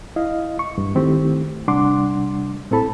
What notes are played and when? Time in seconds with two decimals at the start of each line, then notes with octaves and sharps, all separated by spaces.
0.16 E4 D#5 F5
0.59 C#6
0.78 G2
0.95 D#3 A3 C4 E4 G4
1.68 C3 G3 D4 F#5 C6 D6
2.71 A2 C4 E4 A4 A5 B5